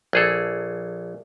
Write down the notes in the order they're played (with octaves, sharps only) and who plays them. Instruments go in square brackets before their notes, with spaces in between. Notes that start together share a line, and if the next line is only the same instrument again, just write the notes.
[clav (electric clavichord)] A#1 G#4 A4